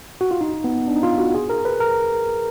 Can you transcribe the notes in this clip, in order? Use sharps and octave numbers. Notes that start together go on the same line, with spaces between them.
F#4
F4
D#4
B3
D4
D#4
F4
F#4
G#4
A#4
B4
A#4